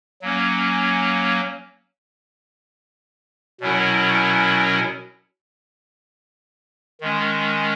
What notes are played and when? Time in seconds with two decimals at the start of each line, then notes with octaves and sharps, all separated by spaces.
0.22 F#3 A#3 C#4
3.61 B2 F#3 C#4 E4 A#4
7.01 D#3 G#3 C#4